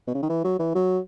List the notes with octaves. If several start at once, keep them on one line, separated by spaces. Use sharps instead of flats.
B2
C#3
D#3
E3
F#3
E3
F#3